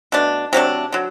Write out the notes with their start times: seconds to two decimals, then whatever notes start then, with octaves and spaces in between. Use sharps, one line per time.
0.12 B2 A3 D4
0.53 C3 F#3 A3 D4
0.92 D3 F#3